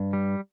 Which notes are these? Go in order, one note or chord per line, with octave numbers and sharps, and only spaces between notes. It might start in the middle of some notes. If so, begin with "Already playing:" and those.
Already playing: G2
G3